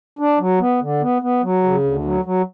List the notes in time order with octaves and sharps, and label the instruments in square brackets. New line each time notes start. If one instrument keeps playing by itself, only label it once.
[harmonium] D4
F#3
B3
D3
B3
B3
F#3
C#3
D2
F#3
F#3